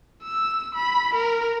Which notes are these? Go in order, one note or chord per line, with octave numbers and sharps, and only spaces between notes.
E6
B5
A#4